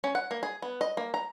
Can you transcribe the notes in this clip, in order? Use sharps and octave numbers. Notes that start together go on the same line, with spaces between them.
C#4
F#5
A#3
G#4
B3
D#5
A#3
A#5